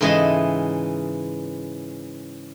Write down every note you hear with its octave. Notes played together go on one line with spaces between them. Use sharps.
G#2 C#3 E3 D#5 A5 C6